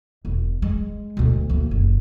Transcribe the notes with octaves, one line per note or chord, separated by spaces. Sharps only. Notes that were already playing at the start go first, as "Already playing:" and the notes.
E1
G#3
D2 B2
D2 A#3
F#1